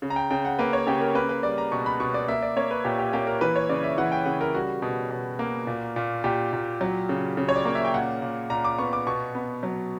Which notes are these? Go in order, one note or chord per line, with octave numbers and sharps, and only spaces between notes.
C#3
A#5
G5
C#3 G5
F#5
A#3 B4
C#5
C#3 G4
A#4
A#3 B4
B4
G3 D5
A#5
B2 C#6
B5
B2 C#6
D5
A#3 E5
D5
A#3 C#5
B4
A#2 G4
G4
A#3 G4
A#4
E3 B4
C#5
C#3 D5
E5
E3 F#5
G5
C#3 F#5
A#4
G3 F#4
B2
B2
A#3
A#2
A#2
A#2 G4
A#2
F#3
C#3
C#3
C#5
D5
A#3
E5
G5
A#2 F#5
A#2
A#2 A#5
D6
B3 C#6
D6
B2 C#6
B3
F#3